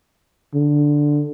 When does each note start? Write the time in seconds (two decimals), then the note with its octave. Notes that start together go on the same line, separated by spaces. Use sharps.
0.54 D3